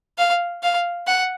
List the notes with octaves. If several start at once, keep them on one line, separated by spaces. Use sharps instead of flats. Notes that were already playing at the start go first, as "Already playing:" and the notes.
F5
F5
F#5